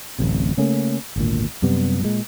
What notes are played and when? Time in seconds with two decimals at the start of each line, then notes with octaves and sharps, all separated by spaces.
0.19 D1 A1 C3
0.57 C#3 A3 A#3 C#4
1.16 G#1 D2 A#2
1.62 F#2 C3 G3 B3
2.02 A#2 G#3